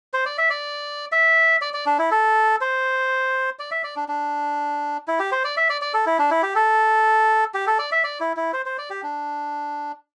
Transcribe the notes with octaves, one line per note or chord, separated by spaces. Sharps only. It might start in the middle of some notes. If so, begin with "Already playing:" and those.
C5
D5
E5
D5
E5
D5
D5
D4
E4
A4
C5
D5
E5
D5
D4
D4
E4
G4
C5
D5
E5
D5
D5
A4
E4
D4
E4
G4
A4
G4
A4
D5
E5
D5
E4
E4
C5
C5
D5
G4
D4